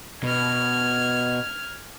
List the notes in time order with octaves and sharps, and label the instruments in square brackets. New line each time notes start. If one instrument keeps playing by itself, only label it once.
[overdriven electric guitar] B2 [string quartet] F6 G#6